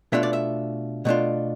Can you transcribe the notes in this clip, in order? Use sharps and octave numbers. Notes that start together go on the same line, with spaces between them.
B2 A3 D4 F4 E5
D5
E5
B2 A3 D4 F4